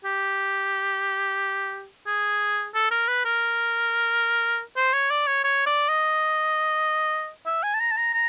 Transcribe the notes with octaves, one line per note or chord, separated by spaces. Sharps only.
G4
G#4
A4
A#4
B4
A#4
C5
C#5
D5
C#5
C#5
D5
D#5
E5
G#5
A5
A#5
A5
A#5
A#5